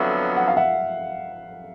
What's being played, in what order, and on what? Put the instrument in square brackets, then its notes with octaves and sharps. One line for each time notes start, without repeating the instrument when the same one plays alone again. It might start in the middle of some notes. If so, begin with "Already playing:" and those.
Already playing: [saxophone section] F2 D3 F#3 B3 [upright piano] E5
[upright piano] F#5
F5
E5 F#5